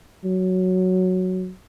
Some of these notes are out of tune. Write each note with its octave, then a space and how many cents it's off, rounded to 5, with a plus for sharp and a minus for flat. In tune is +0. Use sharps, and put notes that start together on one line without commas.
F#3 +0